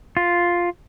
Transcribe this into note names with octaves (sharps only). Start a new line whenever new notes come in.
F4